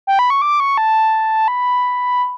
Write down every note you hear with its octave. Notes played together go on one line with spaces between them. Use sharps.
G5
B5
C#6
D6
C#6
A5
B5